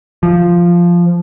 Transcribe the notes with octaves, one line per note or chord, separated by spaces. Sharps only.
F3